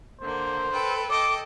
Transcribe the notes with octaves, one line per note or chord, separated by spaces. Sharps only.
D3 A#3 C5
A4 B4 G5
A4 D#5 G5 D6